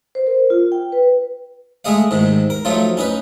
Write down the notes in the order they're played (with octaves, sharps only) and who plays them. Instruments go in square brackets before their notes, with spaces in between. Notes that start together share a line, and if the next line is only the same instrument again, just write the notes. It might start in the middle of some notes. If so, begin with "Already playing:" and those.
[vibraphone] C5
A#4
F4
G5
B4
[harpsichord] G#3 A3 G#4 D#5 F5
G#2 C3 D#3
A#4
F3 F#3 A3 D#4 F4
C#4 D#4 B4